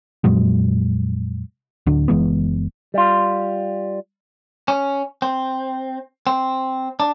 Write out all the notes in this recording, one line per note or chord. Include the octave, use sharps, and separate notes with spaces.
F2 A#2 F#3 G#3
D1 D2 D3
F#1 E3 G#3 B3
G3 F4
C#4
C4
C4
D4